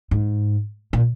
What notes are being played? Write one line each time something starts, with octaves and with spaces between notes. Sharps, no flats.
G#2
A#2